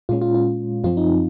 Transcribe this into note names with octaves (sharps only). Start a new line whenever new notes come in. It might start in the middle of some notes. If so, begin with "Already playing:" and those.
A#2 G#3 C#4 F4
F4
F4
F#2 F3 C4 F4
D#4